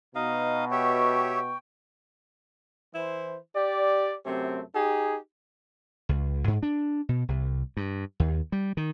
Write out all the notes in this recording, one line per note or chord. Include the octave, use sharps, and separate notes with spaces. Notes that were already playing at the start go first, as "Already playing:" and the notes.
B2 D#4 D#5 F5
G4 C#5 E5 G5 C#6
E3 E4 C5
G4 D5
F#2 C3 A3 C4
D#4 G4 G#4
C#2
G#2
D4
B2
C2
G2
D#2
G3
D#3